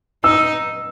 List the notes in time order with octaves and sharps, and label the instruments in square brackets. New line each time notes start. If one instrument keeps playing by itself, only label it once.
[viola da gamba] D#4 [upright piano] E6